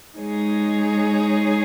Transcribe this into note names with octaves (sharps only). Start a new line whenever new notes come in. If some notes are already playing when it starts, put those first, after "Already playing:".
G#3 D#4 G#4 C#5